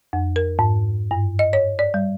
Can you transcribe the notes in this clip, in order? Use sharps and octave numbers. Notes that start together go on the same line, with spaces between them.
F2
A#4
G#2
G2
D#5
C#5
D5
G3